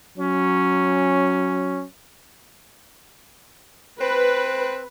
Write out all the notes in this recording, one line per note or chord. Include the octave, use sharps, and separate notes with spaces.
F#3 C#4
C4 B4